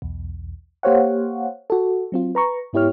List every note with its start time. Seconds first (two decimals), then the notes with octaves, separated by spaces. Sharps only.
0.02 B1 E2
0.83 A#3 G4 C5 C#5 F5 F#5
1.70 F#4 A4
2.12 F#3 C4 F4
2.35 B4 A#5 C#6
2.73 G#2 B3 E4 G4 C#5 F6